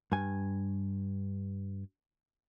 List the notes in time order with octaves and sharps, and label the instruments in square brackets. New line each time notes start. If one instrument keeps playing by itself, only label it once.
[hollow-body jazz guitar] G2 G#5